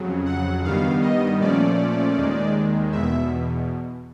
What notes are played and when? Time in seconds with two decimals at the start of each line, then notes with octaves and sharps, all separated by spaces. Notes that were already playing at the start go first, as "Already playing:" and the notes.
Already playing: F2 C#3 F#3
0.26 F#5
0.64 G2 D#3 G3 B3 F5
1.02 D#5
1.40 A#2 F3 A3 C#4 D5
2.17 D#2 D#3 G#3
2.92 E2 B2 E5